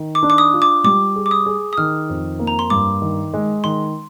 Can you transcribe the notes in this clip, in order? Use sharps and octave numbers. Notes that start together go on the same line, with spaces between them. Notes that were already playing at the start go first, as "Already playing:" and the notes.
Already playing: D#3
D6
D4
D6
D#6
F4
D6
G3 D6
G#4
D6
D#6
G#4
D#6
D#3 F6
F2
A#3
A#5
C6
G2 D6
D#3
G#3
D#3 C6